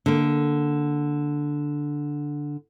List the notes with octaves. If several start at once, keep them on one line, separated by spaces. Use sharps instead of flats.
D3 A#3